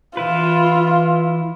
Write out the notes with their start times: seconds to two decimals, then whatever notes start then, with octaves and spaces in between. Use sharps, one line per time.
0.17 E3 E4 F4 B4